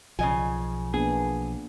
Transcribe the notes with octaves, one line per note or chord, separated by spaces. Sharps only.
B1 C#3 F3 D#5 G#5
A#3 B3 D4 G#4